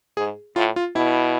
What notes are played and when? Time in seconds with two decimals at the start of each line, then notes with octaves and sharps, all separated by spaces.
0.17 G#2 G#4
0.56 A2 F4
0.76 F4
0.96 B2 E4